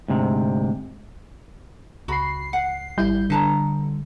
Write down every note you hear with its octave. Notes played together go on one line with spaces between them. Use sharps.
D2 G#2 C3
C#2 F#4 B5 C7
F#5
G#1 G3 E4 G6
D3 B4 A5 A#5